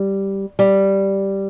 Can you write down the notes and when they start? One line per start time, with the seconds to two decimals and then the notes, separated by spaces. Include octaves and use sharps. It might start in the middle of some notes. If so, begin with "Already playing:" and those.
Already playing: G3
0.59 G3